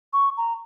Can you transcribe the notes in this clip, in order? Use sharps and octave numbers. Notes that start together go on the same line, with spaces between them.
C#6
A#5